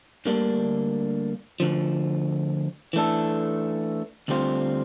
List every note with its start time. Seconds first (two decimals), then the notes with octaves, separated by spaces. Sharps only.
0.25 D2 D3 G3 A#3 D4
1.60 D2 D3 F3
2.93 E3 A3 D4 A4
4.28 D2 D3 G3 C4 F4